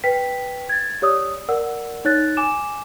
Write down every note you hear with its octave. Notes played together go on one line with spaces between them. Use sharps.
B4 G5 B6
G#6 A6
G4 C#5 D5 D#6 E6
A#4 D5 F#5 E6
D#4 C#5 F#6 A6
G#5 D6 E7